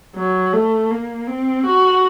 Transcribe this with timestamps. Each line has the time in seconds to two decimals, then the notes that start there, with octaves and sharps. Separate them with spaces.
0.16 F#3
0.53 A3
0.91 A#3
1.27 C4
1.65 F#4